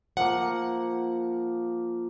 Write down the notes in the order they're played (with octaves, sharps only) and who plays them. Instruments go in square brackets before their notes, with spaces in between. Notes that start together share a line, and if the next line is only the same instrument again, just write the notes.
[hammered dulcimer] F3 A#3 [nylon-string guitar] F#5